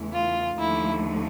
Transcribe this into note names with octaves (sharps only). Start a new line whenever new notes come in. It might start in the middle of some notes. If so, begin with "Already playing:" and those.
Already playing: E2 C#3 E3 A3
F4
D#2 D3 F3 A3 E4